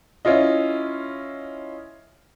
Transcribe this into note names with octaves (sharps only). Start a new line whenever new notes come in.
C#4 E4 F4 D#5